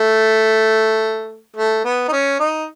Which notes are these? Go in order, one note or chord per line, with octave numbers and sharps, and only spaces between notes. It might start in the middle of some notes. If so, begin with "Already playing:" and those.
Already playing: A3
A3
B3
D#4
C#4
D#4